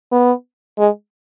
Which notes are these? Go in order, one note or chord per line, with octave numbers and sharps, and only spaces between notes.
B3
G#3